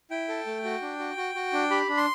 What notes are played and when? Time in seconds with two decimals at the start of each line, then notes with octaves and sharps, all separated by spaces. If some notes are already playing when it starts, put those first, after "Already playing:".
0.11 E4 G5
0.28 A4
0.46 A3
0.64 F#4
0.82 D4
0.99 F#4
1.17 F#4
1.35 F#4
1.53 D4
1.70 G4 B5
1.89 D4
1.97 C6